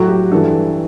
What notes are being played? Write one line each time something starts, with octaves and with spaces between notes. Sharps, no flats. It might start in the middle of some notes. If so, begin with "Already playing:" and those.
Already playing: A2 F#3 F#4
G4
G2 E3 A4